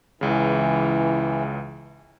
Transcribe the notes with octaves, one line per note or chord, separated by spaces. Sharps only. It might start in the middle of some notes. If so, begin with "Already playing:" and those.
C#2 C#3 E3